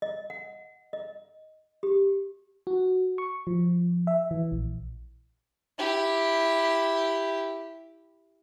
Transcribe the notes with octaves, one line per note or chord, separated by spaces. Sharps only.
D#5
F#5
D#5
G4
F#4
C#6
F3
E5
E3
A#1
E4 G4